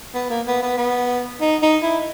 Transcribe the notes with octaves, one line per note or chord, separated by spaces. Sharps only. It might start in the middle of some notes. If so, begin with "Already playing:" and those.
B3
A#3
B3
B3
B3
D#4
D#4
E4